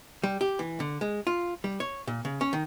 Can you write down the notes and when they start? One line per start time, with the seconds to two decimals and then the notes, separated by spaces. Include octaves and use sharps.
0.24 G3
0.41 G4
0.59 E3
0.80 D3
1.01 G#3
1.27 F4
1.64 G3
1.80 C#5
2.07 A#2
2.25 C#3
2.41 C#4
2.53 D#3